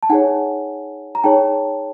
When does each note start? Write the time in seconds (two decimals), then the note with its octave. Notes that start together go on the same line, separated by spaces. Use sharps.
0.03 A5
0.10 D#4 G#4 C#5 F#5 G#5
1.15 A#5
1.24 D#4 G#4 C#5 G5 A5